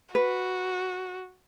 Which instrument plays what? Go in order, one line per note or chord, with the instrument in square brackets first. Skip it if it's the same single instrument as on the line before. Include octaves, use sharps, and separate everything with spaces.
[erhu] F#4 [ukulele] B4